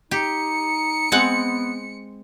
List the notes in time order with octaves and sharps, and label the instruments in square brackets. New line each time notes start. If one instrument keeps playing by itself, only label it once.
[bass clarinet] D#4 [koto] G4 [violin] C#7
[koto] G#3 C4 F#5 [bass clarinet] B3